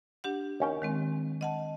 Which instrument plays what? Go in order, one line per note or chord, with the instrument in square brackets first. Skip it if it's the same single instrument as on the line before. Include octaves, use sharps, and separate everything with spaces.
[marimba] D4 G4 F#5
[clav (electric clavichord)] D#2 C#4 G5
[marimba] D#3 G#3 C4
D#5 F#5 A5